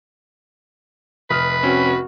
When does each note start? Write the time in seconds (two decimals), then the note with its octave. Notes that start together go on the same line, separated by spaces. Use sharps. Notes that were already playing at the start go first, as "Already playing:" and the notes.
1.30 F1 B4 D#6 F6
1.63 C4 C#4 F#4